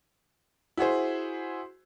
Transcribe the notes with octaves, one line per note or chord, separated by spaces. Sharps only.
E4 F#4 G#4 C5